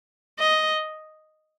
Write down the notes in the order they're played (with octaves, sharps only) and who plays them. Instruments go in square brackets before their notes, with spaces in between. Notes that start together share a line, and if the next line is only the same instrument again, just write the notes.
[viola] D#5